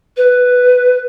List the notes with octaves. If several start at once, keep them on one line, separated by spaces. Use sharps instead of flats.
B4